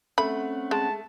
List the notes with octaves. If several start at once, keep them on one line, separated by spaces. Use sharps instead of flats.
A3 C4 C#4 F#5 B5
G#3 A5